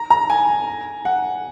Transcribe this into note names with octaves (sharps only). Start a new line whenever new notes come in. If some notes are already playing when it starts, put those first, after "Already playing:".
Already playing: A#5
A#5
G#5
F#5